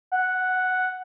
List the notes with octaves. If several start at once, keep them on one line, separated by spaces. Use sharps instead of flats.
F#5